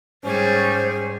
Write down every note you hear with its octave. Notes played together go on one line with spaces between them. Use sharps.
G#2 G3 C#4 G#4 C5